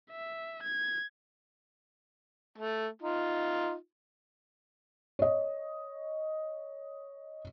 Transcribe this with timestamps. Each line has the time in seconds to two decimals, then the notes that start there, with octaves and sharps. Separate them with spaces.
0.11 E5
0.63 G#6
2.58 A3
3.02 D#4 F4
5.19 C#5 D#5